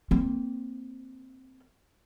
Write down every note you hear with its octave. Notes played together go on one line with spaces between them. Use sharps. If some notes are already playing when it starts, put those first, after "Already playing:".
A#3 C4